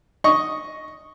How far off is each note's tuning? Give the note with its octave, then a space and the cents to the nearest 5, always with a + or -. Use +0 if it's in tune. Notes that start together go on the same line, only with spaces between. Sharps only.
D#5 +0 C#6 +0